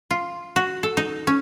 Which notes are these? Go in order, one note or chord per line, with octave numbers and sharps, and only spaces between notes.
F4
F#4
A4
D#4
C#4